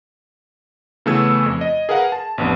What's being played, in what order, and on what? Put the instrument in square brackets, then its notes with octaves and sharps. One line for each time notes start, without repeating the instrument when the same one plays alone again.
[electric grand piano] C#3 E3 A3 B3 E6 G#6
F2
D#5
G#4 A#4 B4 F5 F#5
A5
A1 F2 B3 D4